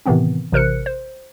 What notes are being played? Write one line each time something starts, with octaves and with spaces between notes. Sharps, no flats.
A2 C3 D#3 E3 B3 C4
A1 C3 A#4 C5 F#6 C#7
C5